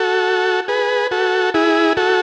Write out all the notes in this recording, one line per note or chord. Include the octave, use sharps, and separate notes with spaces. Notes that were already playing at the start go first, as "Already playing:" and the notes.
Already playing: F#4 A4
G#4 B4
F#4 A4
E4 G#4
F#4 A4